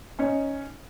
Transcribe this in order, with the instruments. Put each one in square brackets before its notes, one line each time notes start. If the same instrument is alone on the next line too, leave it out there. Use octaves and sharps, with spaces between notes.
[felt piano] C#4 D#4 C#5